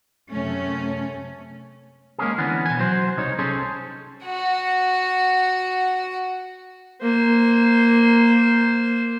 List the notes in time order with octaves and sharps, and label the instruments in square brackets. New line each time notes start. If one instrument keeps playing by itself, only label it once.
[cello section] F#2 C3 A3 C#4
[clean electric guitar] G#3 A#3 C#4 G#4
D3 E3 B3 C#4
B2 G#5
F#3 C5
C2 D#4 C#5
C#4 G#4 A4 C5
[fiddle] F#4 F#5
[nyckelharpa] A#3 C5